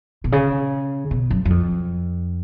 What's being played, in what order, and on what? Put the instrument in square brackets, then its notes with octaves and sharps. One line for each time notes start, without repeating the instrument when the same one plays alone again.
[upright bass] B2
C#3
B2
F#2
F#2
F2